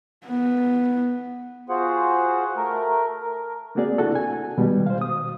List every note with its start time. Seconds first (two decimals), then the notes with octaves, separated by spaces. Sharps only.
0.26 B3
1.69 F4 F#4 G#4 C5 F#5
2.56 A3 A#4
3.22 A#4
3.75 A3 A#3 C4 F#4 G#4 D5
3.98 D4 E4 F#4 A4
4.15 G#5
4.58 B2 D#3 G3 G#3
4.86 C5 F5
5.01 D#6